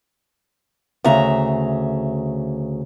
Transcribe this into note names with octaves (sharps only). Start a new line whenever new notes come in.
D2 C#3 E5 A#5